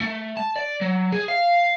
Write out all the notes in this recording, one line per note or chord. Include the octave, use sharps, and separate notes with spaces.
A3
A5
D5
F#3
G#4
F5